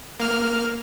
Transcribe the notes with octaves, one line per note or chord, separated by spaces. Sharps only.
A#3 F6